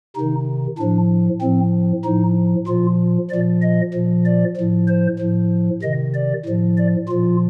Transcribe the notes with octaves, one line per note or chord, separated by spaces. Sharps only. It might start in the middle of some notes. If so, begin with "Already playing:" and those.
C3 D#3 D#4
A2 F3 D4
A2 F3 C4
A2 F3 D#4
A#2 F3 F4
F3 D5
A#2
D#5
A#2 F3
D5
A2 F3
C5
A2 F3
C3 D#3 D#5
D5
A2 F3
D5
A#2 F3 F4